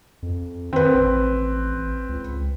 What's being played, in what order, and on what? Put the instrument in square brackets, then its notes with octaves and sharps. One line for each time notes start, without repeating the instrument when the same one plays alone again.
[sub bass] F2
[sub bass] D#3 [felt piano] C4 B4
[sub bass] A1
C#2